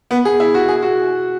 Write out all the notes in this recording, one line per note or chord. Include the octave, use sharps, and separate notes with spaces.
B3
G#4
E4
F#4
G#4
F#4